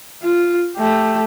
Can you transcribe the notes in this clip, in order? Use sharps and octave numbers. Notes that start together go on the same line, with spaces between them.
F4
A3 G4